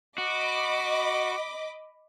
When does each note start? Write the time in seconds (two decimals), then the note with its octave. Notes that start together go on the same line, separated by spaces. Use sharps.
0.18 F#4 D#5 B5 D6